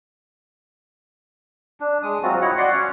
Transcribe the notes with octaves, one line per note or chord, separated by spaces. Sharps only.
D4
G#3 D#6
F#3 C4 F4 F#4
E4 C#5 D#5 F#5
F#4 D5 F#5 C6
C#4 C#5